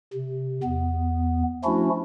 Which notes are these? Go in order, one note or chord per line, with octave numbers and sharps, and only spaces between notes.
C3
E2 B3
F3 A3 C#4 D4 E4 F#4